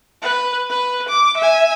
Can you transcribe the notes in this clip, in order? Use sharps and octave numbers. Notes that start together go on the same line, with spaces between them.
B4
B4
D6
E5 G#5